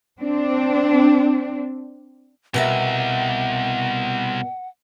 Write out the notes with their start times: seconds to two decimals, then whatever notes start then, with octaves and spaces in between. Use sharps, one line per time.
0.20 C4 D4
2.54 C2 B2 A#4 E5 F#5